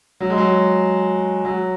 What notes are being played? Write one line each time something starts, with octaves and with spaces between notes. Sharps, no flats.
F#3
G#3
F#3
F#3